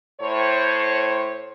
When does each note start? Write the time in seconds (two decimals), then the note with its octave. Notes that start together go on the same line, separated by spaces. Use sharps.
0.21 A2 C5 C#5